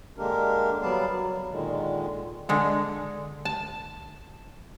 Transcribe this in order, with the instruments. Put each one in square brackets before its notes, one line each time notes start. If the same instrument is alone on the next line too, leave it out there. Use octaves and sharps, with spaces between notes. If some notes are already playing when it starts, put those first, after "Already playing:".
[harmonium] D3 G#3 A#3 D4 G4 A#4
F#3 G3 B3 D5 F5 A5
F#3
A#2 D3 D#3 G#3
[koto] D3 G#3 A4
A5